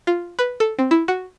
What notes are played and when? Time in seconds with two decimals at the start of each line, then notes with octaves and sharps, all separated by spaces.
0.07 F4
0.39 B4
0.60 A4
0.79 C4
0.91 E4
1.08 F#4